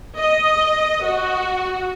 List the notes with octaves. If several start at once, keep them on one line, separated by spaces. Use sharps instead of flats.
D#5
F#4